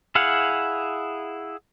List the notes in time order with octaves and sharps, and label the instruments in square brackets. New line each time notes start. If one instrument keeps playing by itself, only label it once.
[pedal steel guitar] E4 G#4 F5 F#5